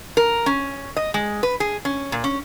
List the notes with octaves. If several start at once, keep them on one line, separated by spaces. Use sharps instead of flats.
A#4
C#4
D#5
G#3
B4
G#4
C#4
A#2
C#4